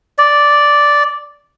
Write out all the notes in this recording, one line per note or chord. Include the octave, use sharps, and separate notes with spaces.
D5